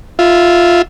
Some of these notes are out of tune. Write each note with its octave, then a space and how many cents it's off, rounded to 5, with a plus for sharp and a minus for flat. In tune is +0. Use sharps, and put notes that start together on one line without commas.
F4 +0 E5 +0